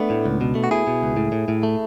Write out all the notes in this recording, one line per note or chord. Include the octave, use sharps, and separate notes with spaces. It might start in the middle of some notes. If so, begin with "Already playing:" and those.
Already playing: A3 B3 D4
A2
C#2
B2
A3
F#4
B2 E4 G#4
B2
C#2
A2
A2
A2
A3